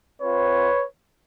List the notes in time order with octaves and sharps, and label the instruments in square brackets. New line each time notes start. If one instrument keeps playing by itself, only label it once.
[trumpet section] C4 F4 B4 C#5